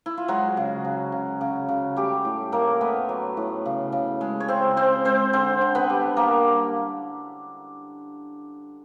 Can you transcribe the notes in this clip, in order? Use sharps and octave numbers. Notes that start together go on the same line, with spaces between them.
E4
F4
F#3 G#3 F#4
C#3
C#3
C#3
C#3
C#3
G3 A3 G4
A2
A2 A#3 A#4
A3 B3 B4
F#3
A2
C#3
C#3
G#3
C#5
C#3 C4 C5
G#3 C4 C5
G#3 C4 C5
D3 C4 C5
D3
B3 B4
G3
G3 A#3 A#4